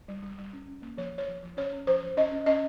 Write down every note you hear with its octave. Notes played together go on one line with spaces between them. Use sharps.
G3
G3
G3
C#4
C#4
A#3
F3 C#5
F3
C#5
F3
F3
C#4 C#5
C#4
F3 C5
F3
C#4 D#5
C#4
C#4 D#5